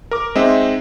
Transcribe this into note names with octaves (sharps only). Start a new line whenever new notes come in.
A#4 D6
G#3 C4 D#4 D#5 E5